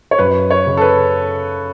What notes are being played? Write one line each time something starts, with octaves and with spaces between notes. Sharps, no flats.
C#5
F#2 B4
C#5
C#3
A4
B4